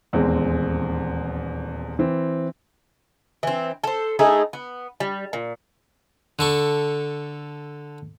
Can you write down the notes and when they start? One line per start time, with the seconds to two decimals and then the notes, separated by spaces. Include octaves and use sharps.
0.13 D#1 E2 G#3 C4
1.99 E3 C4
3.43 E3 C4
3.84 A4 C5
4.19 A3 D#4 E4 G#4
4.53 B3
5.00 G3
5.33 A#2
6.39 D3 A4 C#6